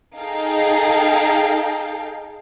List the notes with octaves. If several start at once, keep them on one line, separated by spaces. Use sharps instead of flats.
D#4 G#4 A4 F5 G5